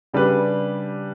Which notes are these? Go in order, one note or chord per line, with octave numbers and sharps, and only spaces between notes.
C#3 G3 D4 G4 B4